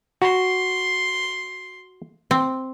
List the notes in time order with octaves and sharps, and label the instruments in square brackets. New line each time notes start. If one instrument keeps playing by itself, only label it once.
[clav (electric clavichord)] F#4 [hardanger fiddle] C6
[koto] C4